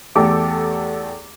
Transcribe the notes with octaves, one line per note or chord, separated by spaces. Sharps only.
E2 A3 G4 A4 D6